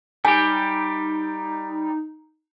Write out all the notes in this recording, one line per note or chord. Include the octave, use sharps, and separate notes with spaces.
G3 D#4 G4 G#5